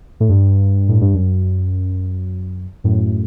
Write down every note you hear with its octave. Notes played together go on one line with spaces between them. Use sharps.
A2
G2
A2
G2
F#2
F#2 A2